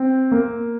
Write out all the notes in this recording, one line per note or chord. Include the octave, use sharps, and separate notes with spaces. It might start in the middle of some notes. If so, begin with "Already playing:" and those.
Already playing: C4
A#3